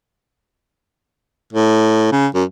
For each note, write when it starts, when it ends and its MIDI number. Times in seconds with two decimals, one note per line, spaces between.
1.53 2.10 45
2.12 2.27 49
2.35 2.44 42